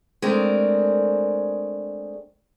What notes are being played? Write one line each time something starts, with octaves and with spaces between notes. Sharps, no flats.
G#3 A3 C4 D4 A#4